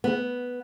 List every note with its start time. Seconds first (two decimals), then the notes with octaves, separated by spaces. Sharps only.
0.04 B3